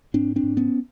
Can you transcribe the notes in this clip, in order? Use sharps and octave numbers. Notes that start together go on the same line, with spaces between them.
G#2 C4 D4
C4 D4
G#2
B3 C#4